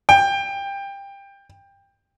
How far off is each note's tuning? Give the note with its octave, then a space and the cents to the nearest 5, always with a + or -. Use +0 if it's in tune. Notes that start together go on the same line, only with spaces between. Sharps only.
G5 +20